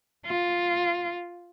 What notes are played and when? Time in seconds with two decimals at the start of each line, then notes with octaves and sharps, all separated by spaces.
0.26 F4